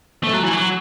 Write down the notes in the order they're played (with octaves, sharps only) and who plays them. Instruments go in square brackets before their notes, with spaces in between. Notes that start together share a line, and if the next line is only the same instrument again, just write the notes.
[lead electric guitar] A3
F#3
E3
F#3